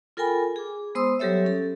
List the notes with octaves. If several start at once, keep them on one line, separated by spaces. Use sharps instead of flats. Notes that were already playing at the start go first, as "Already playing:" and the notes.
F4 A4 A#4 G5 G#5 B5
G#4 D6
G#3 B3 C5 C6 D#6 E6
F#3 G3 G4 A4 C#5 E5
C#4 A4